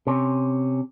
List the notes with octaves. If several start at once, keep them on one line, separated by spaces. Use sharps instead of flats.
C3 C#4